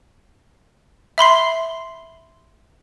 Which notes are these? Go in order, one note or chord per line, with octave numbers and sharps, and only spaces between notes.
E5 B5 C6 C7